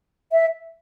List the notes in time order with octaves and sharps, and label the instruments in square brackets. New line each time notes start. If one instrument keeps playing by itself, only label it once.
[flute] E5